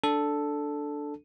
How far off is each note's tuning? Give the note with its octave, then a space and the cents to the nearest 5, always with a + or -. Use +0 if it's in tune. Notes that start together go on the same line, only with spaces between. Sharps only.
D4 +0 A4 +0